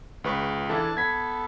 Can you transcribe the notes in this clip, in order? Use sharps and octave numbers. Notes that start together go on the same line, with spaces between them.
C#2 B4 C#6
E3 D4 E4 A4 A5
B3 A4 G#6 B6